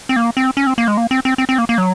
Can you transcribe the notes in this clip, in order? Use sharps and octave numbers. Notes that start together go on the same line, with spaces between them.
C4
A#3
C4
C#4
C4
A#3
G#3
A#3
C4
C4
C4
C4
A#3
A#3
F#3